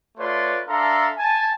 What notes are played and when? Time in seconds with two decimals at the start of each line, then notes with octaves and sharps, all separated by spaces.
0.18 A3 F4 B4 C#5 D5 C6
0.67 D4 A4 E5 F5 A#5 C6
1.17 G#5 A5